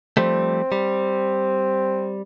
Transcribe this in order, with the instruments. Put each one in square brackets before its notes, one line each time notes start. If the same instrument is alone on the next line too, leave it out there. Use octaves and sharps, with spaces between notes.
[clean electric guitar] F3 G3 A3 [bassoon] C4
[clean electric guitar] G3